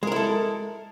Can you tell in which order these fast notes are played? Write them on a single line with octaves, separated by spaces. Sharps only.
G#3 A#4 E4 A4